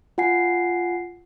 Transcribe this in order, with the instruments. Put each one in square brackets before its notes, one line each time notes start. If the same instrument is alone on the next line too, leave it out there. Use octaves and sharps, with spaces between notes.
[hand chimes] F4 F#5 G#5 C7